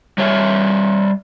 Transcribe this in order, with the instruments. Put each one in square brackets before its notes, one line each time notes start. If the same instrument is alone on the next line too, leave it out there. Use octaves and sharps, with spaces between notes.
[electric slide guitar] G3 C#5 E5